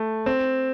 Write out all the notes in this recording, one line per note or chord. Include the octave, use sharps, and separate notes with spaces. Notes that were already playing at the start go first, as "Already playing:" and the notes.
Already playing: A3
C4